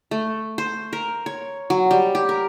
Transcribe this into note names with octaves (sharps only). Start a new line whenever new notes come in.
A3
C5
A#4
C#5
F#3
G3
G4
A#4